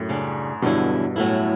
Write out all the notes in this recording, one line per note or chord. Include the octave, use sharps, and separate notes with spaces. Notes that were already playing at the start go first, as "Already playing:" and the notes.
Already playing: F#2 A2
C#3 G3 D4
E2 G2 B2 D3 F#3 C#4 E4
A2 F#3 A3 C#4 E4